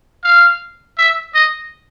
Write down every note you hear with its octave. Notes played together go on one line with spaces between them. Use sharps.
F5
E5
D#5